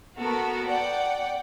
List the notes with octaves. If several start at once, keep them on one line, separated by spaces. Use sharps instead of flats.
B3 F#4 A4 A#4
D5 F#5 G5